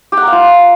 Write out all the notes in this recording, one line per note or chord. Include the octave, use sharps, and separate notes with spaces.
G4
F#5
A#4
F5
F4